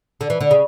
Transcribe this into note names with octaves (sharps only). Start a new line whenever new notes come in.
D3
E3
D3
C#3